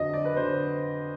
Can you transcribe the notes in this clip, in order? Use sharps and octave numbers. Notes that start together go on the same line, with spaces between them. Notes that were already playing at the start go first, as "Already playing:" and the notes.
Already playing: F2 D3 F#3 D#5
D5
B4
D3 F#3 C5